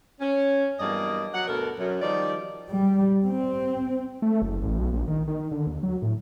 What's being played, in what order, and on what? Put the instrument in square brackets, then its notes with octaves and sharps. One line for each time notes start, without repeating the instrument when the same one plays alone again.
[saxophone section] C#4
E2 G2 F#3 A#3 D5 D#5
F#3 F#5
D2 B2 A4 A#4
F#2
D#3 F3 G3 D#4 D5
[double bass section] G3
C4
[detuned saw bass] A3
F#1
A1
B1
A#1
D#3
D#3
D3
D#2
F#3
A2